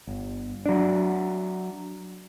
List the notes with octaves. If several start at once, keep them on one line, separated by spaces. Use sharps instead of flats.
G1
F#3 D4